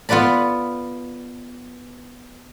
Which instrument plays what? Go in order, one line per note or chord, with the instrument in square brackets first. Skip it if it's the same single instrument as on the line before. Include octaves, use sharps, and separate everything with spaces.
[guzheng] B3 F4 B4 D5 B5